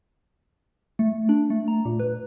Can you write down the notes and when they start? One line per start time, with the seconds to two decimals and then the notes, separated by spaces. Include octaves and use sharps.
0.99 A3
1.29 D4
1.50 A3
1.68 A#5
1.85 A#2
2.00 B4